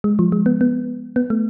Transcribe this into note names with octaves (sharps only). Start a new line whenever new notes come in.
G#3
F3
G#3
B3
B3
B3
A3